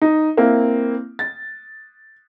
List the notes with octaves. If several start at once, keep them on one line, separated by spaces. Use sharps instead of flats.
D#4
A#3 C4 E4
A6